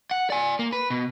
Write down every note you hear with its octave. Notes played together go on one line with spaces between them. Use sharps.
F#5
D5 G#5
A#3
B4
B2